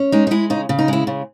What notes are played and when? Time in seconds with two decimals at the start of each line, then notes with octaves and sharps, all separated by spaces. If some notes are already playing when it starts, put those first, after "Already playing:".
Already playing: C#4
0.12 G#3 D#4
0.27 D#4
0.31 G#3 E4
0.50 C#3 D#4
0.69 C#3
0.78 D#4
0.88 G#3 E4
1.07 C#3